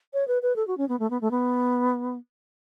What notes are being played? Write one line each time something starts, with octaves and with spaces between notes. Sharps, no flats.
C#5
B4
B4
A4
F#4
C#4
B3
A3
B3
A3
B3